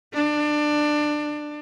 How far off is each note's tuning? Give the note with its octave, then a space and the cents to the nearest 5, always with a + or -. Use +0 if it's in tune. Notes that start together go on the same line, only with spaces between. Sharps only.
D4 +20